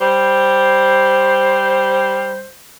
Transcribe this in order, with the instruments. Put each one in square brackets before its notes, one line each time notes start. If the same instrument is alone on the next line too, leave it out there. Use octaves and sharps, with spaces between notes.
[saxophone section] G3 C5